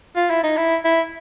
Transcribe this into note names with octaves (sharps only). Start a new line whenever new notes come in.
F4
E4
D#4
E4
E4